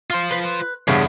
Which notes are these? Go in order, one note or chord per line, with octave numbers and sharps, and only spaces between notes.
F4 C5 C6 F6
B4 C6 B6 F#7
E2 G2 C#3 E5 F#5 B6 C7